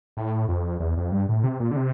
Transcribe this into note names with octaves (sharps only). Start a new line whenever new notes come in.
A2
F2
E2
F2
G2
A2
C3
A#2
D3
C3